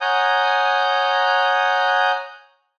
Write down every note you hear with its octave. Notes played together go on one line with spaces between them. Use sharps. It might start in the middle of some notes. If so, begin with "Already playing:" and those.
C#5 F#5 G#5 A#5 D#6 G6